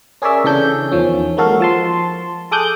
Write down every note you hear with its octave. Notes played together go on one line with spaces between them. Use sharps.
C#4 G#4 A#4 C#5 D5 E5
C#3 E3 C#4 D4 A4 G6
E2 D#3 F3 C#4
G#3 A#3 F#4 A4 F5
F3 A5 C6
G#4 A4 D6 D#6 F#6 G6